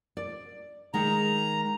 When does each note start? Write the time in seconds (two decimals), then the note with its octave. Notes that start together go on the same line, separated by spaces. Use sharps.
0.17 D5
0.94 D#3 G#3 D#4 A#5